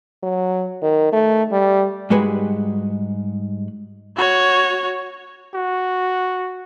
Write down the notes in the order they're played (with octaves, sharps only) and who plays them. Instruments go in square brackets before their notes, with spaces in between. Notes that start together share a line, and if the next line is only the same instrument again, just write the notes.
[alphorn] F#3
D#3
A3
G3
[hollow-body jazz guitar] G#2 G3 G#3 F#4 B4 G#5
[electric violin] F#4 C#5
[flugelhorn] F#4